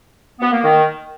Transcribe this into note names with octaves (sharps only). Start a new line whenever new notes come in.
B3
A#3
D#3